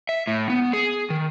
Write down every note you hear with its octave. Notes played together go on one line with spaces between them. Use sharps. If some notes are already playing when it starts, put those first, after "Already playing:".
E5
A2
B3
G#4
D#3